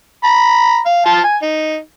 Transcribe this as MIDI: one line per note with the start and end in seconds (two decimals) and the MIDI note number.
0.24 0.80 82
0.24 0.80 83
0.86 1.03 77
1.06 1.20 65
1.06 1.20 81
1.24 1.36 80
1.42 1.77 63